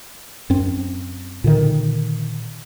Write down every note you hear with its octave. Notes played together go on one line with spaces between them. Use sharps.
F#2 C4
A#2 D3 D#3